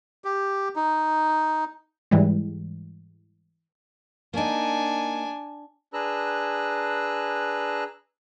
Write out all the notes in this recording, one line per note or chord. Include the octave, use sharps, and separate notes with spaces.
G4
D#4
G#2 E3 G3 G#3
A#3 D4 D#4 G#5
D4 G#4 B4 A#5 E6 F#6